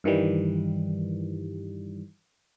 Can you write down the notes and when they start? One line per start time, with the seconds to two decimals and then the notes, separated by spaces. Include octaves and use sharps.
0.04 G2 D#3 E3 G3